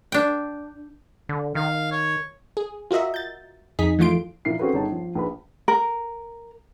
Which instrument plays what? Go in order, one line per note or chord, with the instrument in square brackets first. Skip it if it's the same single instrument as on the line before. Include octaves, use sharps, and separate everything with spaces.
[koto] D4 G5
[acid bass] D3
[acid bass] D#3 [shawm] F5
[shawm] C#5
[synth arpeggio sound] G#4
F4 F#4 A#4 D#5 E5
G6 A6
F2 D#4 G#4 B6
E3 F3 A3 F4 C6 D7
[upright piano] A#2 E3 F3 A#3 E4 C7
C4 C#4 F#4 G#4 A4 B4
G1 D#4 G#4 C#5 A5
F3
A#1 B4 B5
[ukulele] A#4